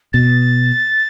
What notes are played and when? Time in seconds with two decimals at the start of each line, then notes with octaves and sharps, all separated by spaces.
0.13 B2 A6